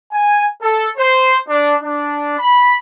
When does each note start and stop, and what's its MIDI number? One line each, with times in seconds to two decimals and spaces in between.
0.11 0.46 80
0.61 0.89 69
0.97 1.35 72
1.48 1.74 62
1.81 2.38 62
2.39 2.75 83